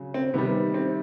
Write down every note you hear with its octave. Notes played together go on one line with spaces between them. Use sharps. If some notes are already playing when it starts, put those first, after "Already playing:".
Already playing: C#3 F#3
C4
C3 D#3 G3 B3
C4